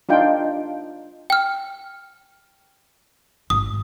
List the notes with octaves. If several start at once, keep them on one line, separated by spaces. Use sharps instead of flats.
D4 D#4 F4 G5
G5 F6
G#1 D#6